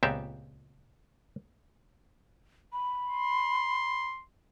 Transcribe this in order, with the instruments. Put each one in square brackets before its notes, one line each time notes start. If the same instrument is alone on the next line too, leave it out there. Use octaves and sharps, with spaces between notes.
[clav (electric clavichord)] C#2 A#2 B3 C4 G4 E5
[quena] B5
[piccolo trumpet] C6